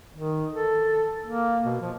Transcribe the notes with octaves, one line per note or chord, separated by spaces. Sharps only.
D#3
A4
A#3
B2
F3